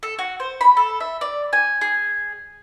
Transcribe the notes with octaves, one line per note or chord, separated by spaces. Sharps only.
A4
F#4
C5
B5
A4
E5
D5
G#5
G#4